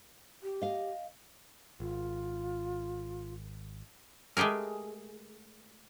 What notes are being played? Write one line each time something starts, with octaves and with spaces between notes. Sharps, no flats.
G4
D#5 F5
G#1 F4
G#3 A3 G4 G#4 A#4